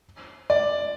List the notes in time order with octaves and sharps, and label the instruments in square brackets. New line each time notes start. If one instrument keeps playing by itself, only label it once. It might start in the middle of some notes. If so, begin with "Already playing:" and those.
[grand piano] D5